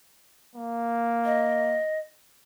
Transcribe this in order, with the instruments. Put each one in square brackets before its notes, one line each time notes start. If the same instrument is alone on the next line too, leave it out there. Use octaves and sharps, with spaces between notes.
[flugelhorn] A#3
[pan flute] D#5